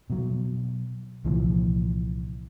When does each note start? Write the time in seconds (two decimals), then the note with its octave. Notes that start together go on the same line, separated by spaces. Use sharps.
0.10 B2 F#3
1.24 C2 A#2 E3 F3